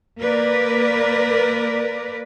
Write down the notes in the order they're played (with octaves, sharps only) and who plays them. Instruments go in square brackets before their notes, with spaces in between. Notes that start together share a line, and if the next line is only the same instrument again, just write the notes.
[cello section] A#3 A#4 B4 D5